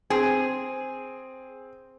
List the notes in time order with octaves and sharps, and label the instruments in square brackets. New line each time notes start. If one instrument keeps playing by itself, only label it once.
[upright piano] C4 [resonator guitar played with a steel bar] G#4